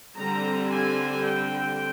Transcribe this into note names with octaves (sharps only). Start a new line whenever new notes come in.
D3 G3 C4 A#5
G#5
G5